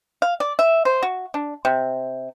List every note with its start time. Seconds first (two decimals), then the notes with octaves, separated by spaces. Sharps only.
0.22 F5
0.40 D5
0.59 E5
0.85 C5
1.03 F#4
1.34 D4
1.65 C3